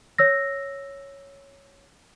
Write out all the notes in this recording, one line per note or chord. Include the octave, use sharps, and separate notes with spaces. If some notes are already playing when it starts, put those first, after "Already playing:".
C#5 E6 A#6